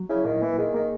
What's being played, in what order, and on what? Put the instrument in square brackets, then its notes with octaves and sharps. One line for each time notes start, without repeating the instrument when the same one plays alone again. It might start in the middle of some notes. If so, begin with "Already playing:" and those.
Already playing: [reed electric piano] F#3
[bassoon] C#3 [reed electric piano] E4
[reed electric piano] A#2 [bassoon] D#3
[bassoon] E3 [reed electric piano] A#3
[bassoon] D#3 [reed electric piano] G#4
[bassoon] D#3 [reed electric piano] A#3